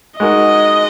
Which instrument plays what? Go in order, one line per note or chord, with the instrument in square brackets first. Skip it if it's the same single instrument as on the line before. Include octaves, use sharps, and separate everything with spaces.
[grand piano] G#3 D#4 F#4 A#4 [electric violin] D#5